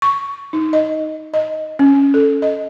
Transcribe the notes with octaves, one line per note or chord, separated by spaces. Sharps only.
C#6
D#4
D#5
D#5
C#4
A4
D#5